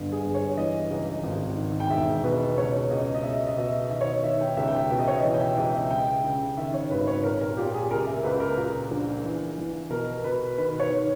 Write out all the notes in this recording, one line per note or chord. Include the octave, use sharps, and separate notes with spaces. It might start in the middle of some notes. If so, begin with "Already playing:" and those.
Already playing: G1
G#4
G1
C#5
E3 D#5
C#2
G#1
D#3
G5
E1 E5
B2 B4
C#2 C#5
C#2 D#5
D#5
B2 E5
D#5
B2 E5
D#3 E5
C#5
D#5
D#3 E5
G5
C#2 E5
G5
E5
B2 E5
D#5
C#5
D#5
E3
G5
E5
C#2 D#5
E5
C#2 G5
C#3
D#3 E5
C#5
G#1 B4
C#5
A#2 A#4
A#4
A#2 G4
G#4
C#2 A#4
E5
C#2 B4
A#4
A#2
A#1
E3
E3
B2 A#4
B2 B4
D#3 B4
C#5
D#3